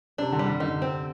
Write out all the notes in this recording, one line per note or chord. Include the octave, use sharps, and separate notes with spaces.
C3 D4
D3
G3
D3
D3 D#4
C4